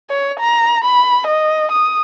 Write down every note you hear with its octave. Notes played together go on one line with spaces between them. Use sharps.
C#5
A#5
B5
D#5
D#6